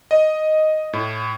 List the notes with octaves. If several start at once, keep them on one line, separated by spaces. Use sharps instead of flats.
D#5
A2